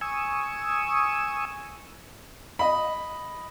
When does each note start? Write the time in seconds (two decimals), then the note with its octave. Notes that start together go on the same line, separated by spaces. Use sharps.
0.01 G#5 C#6 D#6 E6
2.59 D#5 B5